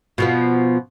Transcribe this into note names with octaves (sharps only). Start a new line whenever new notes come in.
B2 F3 B3